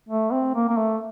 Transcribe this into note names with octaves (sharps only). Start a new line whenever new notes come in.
A3
C4
A#3
A#3
A3